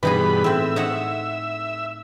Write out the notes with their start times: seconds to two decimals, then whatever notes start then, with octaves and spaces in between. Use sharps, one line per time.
0.03 G2 B2 E3 D#4 G#4 B5
0.44 A2 C4 E5
0.76 D#4 C#5 F#5